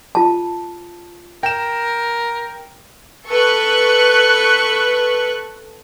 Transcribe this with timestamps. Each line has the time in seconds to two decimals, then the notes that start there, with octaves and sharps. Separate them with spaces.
0.15 F4 A5
1.43 A#4 G5 E7
3.28 A4 B4 C#6 F#6